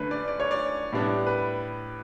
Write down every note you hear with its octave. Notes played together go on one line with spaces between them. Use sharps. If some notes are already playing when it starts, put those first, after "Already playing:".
Already playing: D3 A3 C#4 B4
D5
D5
C#5
D5
A2 G3 B3 D4
B4